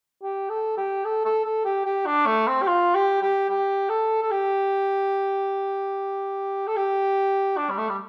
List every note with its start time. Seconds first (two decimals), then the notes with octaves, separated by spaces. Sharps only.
0.22 G4
0.50 A4
0.77 G4
1.05 A4
1.25 A4
1.45 A4
1.65 G4
1.85 G4
2.06 D4
2.26 A3
2.47 C4
2.62 G4
2.68 F4
2.95 G4
3.22 G4
3.49 G4
3.89 A4
4.22 A4
4.31 G4
6.67 A4
6.76 G4
7.57 D4
7.70 G3
7.78 A3
7.89 G3